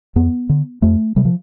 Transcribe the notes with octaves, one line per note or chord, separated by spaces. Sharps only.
F2 B3
D3
F2 A3
C3 G3
F3